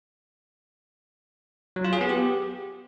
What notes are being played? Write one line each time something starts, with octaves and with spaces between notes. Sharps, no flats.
F#3
F4
G#4
B3
G4